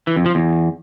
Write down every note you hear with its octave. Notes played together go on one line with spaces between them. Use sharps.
E3
F2
F3
E2